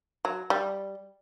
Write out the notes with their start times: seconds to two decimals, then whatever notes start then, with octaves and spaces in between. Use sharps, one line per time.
0.25 F#3
0.50 G3